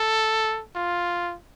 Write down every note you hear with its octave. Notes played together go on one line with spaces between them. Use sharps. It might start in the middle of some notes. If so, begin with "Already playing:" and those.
Already playing: A4
F4